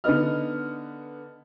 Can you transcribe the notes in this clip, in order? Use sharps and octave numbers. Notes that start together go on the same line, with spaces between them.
D3 B3 D#4 B4 D#5 F6